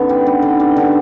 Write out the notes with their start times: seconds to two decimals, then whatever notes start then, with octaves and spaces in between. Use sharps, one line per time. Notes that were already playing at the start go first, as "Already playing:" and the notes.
Already playing: D3 B3 C#4 D#4
0.09 G3
0.26 B3 D4
0.42 D3
0.48 D#4
0.60 G3
0.72 D#4
0.77 D3